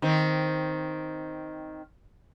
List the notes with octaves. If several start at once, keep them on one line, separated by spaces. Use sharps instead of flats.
D#3 C4